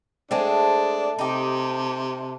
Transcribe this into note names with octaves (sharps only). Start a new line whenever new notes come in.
G#3 A3 C4 D4 A5
C3 D#4 G4